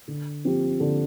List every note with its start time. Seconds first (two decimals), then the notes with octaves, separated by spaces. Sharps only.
0.08 D3
0.45 F3 C4 G4
0.80 D3